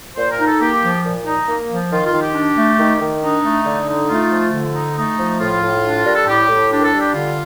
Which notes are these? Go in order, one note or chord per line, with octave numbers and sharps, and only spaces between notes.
A#2 C5
A#4
D#4
A4
A#3 G4
F3
A#2
D#4
A#3
F3
D#3 F4
F4
D#3
G4
D4
A3
D#3
D#3
D4 D#4
A3
D3
D#4
A3 F4
F3
D3
D#4
A3 D#4
F3
A2 F4
A2
D4
G3 A#4
A4
A2 G4
A2
D4 G4
A#4
A4
G3
G4
D3 F4